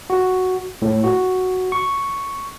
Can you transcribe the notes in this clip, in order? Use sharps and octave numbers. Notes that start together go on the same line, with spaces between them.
F#4
A2
F#4
C#6